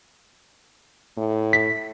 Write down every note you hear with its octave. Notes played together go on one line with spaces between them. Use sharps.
A2
B6